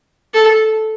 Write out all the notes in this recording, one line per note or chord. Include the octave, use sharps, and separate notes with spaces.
A4